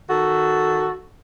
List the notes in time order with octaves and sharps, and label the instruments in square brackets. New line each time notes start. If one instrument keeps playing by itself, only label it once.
[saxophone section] D#3 F#4 A4